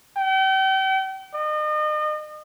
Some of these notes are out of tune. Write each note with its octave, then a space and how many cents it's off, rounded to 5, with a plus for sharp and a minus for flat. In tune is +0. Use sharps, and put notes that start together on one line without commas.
G5 -40
D#5 -40